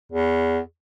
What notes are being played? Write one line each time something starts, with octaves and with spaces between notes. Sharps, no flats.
E2